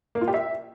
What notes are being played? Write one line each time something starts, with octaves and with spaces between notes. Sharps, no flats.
A#3
F4
G4
E5